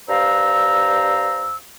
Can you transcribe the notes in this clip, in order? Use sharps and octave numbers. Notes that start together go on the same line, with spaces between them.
G2 C5 F5 A#5 E6